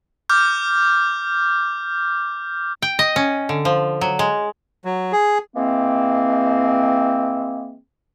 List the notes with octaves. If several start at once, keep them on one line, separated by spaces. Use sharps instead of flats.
D6 F6 G6
G5
D#5
C#4
D3
F3
F#3
G#3
F#3
G#4
E3 G#3 A#3 C4